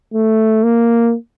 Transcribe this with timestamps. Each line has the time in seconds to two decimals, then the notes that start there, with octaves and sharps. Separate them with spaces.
0.14 A3
0.63 A#3